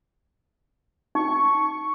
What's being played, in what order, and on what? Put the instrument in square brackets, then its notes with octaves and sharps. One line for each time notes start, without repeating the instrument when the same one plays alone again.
[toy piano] D#4 [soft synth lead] C#6